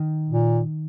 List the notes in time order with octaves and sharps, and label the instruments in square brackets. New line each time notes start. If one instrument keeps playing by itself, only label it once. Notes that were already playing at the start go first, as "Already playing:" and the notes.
Already playing: [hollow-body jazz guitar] D#3
[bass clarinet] A#2